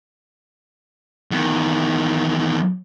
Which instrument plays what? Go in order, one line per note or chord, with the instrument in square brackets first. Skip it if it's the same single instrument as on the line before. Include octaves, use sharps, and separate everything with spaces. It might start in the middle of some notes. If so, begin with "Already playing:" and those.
[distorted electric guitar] E2 D#3